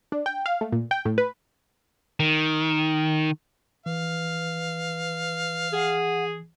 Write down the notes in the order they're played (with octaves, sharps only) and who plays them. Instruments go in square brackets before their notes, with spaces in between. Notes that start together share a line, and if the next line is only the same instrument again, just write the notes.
[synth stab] D4
G5
F5
A3
A#2
G5
A2
B4
[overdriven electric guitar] D#3
[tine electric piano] E3 [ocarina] B4 [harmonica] F5
[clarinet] G#4 [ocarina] F#5